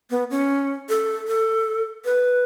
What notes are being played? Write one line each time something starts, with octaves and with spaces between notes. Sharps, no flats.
B3
C#4
A4
A4
B4